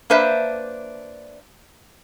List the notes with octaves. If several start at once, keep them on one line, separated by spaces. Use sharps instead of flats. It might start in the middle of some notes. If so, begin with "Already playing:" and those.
A#3 D4 B4 C5 E5